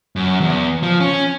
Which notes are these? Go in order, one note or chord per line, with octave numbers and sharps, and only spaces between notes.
F#2
E2
F3
C#4